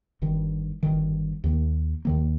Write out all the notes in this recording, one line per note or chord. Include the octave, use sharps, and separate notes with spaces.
G1 G2 D#3
G1 G2 D#3
D#2 D#3 A#3
D#2 D#3 A#3